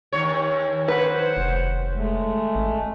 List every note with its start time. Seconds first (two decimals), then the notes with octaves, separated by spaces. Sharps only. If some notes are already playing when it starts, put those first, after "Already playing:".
0.12 D#2 C#5
0.88 B4 C5 F#5
1.37 F1
1.96 G#3 A3
2.55 A1